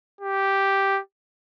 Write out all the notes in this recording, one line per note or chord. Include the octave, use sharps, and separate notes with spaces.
G4